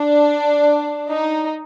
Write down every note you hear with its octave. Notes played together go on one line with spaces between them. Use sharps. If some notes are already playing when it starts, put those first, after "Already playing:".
Already playing: D4
D#4